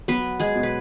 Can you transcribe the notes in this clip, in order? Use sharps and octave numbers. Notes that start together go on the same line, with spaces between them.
F#3 B3 B4
G#3 G#4
B2
B4